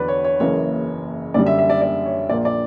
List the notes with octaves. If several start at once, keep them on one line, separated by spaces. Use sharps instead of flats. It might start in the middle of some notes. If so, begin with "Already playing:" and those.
Already playing: E2 D3 F#3 B4 D5
C#5
C#5
F#1 F#2 C#3 E3 A#3 C#5
F#2 D3 G3 D5
E5
E5
D5
D5
C#5
A#1 A#2 A#3 D5
D5